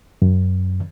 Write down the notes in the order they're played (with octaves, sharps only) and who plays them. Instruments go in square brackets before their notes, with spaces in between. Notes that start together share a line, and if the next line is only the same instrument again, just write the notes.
[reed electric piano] F#2